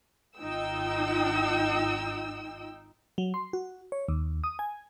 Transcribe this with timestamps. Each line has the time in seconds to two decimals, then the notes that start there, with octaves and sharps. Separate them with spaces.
0.39 G#1 D#4 F4 G5 E6
3.18 F#3
3.34 C6
3.53 F#4
3.92 C#5
4.08 D#2
4.44 D#6
4.59 G#5